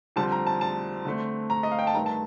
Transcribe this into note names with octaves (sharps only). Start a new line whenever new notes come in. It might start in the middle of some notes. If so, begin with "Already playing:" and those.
F2 D3 G3 C4 A5
A#5
A5
A5
D3 A3 C4
A#5
D#5
F5
G5
A5
G2 D#3 A3 A#5
A5